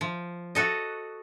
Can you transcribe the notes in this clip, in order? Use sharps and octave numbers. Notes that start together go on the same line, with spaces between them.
F3
F#4 A4 D#5